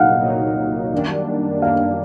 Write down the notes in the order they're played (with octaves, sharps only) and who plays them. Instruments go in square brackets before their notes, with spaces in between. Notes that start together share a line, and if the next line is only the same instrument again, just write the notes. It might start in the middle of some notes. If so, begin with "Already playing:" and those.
Already playing: [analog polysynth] C2 A#2 F#3 A#3 D#4 [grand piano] F5 F#5
[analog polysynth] C2 A#2 F#3 A#3 D#4
F#2 D#3 G3 A#3 D4
[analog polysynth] F#2 D#3 G3 A#3 D4 [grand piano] F5